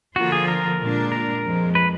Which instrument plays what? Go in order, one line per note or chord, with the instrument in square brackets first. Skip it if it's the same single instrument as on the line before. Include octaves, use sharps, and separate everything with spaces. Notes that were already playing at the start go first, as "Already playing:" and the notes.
[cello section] D3 F3 A#3 F4 [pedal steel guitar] F#4
[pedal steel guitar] G#4
A#4
[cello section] A#2 G#3 D4
[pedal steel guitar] A#4
[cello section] F2 F3 G#3
[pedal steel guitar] B4